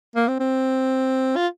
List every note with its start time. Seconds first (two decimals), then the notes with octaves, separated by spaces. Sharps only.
0.16 A#3
0.28 C4
0.40 C4
1.36 F4